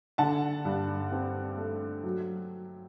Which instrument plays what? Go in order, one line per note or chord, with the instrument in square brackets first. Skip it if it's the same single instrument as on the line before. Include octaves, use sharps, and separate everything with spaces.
[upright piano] D3 F#5 A5
G2
C4
A3
F#3